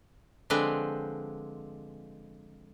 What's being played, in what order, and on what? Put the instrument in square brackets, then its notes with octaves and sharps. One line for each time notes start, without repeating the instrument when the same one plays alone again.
[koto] D3 F3 G#3 C4 B4